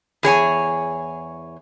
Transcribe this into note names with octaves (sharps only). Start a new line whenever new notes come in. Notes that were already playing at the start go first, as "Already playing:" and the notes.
E2 G#4 C#5 G#5